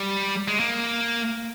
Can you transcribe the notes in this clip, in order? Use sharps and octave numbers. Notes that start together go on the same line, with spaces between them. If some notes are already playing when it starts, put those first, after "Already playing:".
Already playing: G3
G#3
A#3